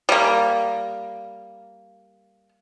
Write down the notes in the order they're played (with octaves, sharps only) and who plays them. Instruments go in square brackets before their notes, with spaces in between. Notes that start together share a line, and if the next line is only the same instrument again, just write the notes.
[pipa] G3 A#3